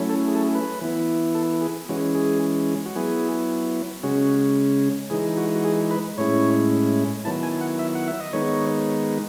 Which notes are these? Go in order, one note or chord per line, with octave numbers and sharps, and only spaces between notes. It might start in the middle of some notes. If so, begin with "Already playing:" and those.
Already playing: F#3 A3 C#4 E4
A4
G#4
A4
G#4
B4
E3 B3 E4
A4
G#4
E3 G#3 C#4 F#4
G#4
F#4
F#3 B3 E4 G#4
C#3 G#3 C#4 F#4
E3 G#3 D#4 G#4
F#4
F#4
G#4
B4
A2 G#3 C#4 E4 C#5
D#3 F#3 B3 E4 A5
G#5
F#5
E5
F#5
E5
D#5
D#3 G#3 B3 D#4 C#5